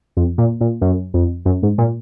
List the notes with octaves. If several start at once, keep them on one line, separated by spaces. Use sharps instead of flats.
F2
A#2
A#2
F#2
F2
F#2
G#2
A#2